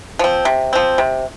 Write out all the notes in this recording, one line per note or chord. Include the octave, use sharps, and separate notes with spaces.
F3 C4
C3
F3 C4
C3